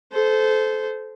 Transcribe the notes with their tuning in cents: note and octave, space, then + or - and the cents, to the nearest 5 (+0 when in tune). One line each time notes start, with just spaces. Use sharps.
A4 -25 C5 -20